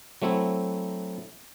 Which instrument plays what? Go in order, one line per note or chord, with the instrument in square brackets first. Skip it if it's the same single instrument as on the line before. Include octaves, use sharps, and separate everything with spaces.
[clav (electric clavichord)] F#3 A3 C4 E4